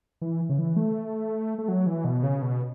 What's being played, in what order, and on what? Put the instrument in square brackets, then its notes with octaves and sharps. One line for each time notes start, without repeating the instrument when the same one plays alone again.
[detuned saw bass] E3
C#3
E3
A3
A3
F#3
E3
B2
C#3
B2